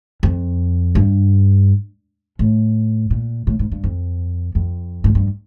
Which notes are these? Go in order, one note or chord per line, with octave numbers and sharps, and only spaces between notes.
F2
G2
A2
A#2
A2
G#2
G2
F2
F2
G#2
G2